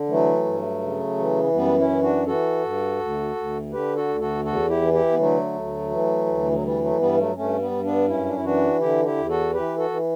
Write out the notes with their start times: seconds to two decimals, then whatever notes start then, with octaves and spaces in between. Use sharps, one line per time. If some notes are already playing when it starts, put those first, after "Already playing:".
Already playing: D3
0.09 E3 F#3 A3
0.45 G2
0.81 C#3
1.18 E3
1.54 F#2 G3 B3
1.78 C#4 E4
1.91 E3
2.02 D4 F#4
2.27 E3 F#4 A4
2.63 G2
3.00 D2
3.35 D2
3.72 D3 G4 B4
3.96 F#4 A4
4.08 D2
4.21 F#4 A4
4.45 E2 F#4 A4
4.69 E4 G4
4.81 E3
4.93 E4 G4
5.12 B3
5.17 D3 F#3 A3
5.54 D2
5.90 E3
6.26 D2
6.51 F#3
6.63 E3 G3
6.81 F#3 A3
6.99 G2 G3 B3
7.17 F#3 A3
7.35 G2 A3 C#4
7.60 G3 B3
7.71 G2
7.84 B3 D4
8.08 F#2 C#4 E4
8.26 D4
8.35 E4
8.44 E3 D4 F#4
8.81 D3 E4 G4
9.05 E4 G4
9.17 E2
9.29 F#4 A4
9.53 E3 G4 B4
9.77 F#4 A4
9.90 E3